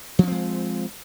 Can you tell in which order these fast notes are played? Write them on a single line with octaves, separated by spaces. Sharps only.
F3 C#4 C4 G#3